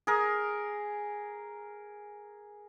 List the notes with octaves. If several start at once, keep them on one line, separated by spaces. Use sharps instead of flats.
G#4 A#4